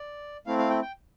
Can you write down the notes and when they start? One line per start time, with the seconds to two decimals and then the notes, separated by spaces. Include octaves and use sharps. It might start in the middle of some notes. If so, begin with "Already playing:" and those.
Already playing: D5
0.46 A3 C4 E4 F5
0.59 F5
0.70 G5
0.82 G5